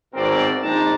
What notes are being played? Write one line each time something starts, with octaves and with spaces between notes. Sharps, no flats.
G#1 G#2 B2 C4 A#4 D5
A#1 C4 D4 D#4 A5 A#5